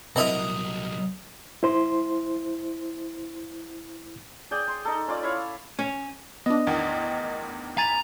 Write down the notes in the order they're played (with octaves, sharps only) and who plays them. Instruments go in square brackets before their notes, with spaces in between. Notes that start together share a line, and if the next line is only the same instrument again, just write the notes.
[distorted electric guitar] C2 F#3 [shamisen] C4 E4 E5 [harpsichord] A#4 D#5 F#5
[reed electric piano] E4 C5 C6
[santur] G#4 D5 G5
C6
D#4 A4
C#4 F4 D5
E4 C#5 F5
[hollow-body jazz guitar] C#4
[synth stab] B3 D4 [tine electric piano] D#5
[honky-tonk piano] A1 E2 D#3
[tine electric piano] G#5 A6 [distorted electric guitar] A#5 [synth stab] B5 D#7